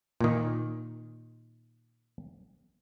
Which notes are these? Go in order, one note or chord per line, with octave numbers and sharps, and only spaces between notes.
A#2 D#3